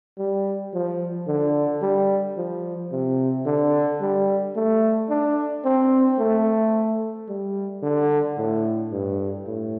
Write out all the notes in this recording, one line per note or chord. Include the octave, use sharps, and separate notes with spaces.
G3
F3
D3
G3
F3
C3
D3
G3
A3
D4
C4
A3
G3
D3
A2
G2
A2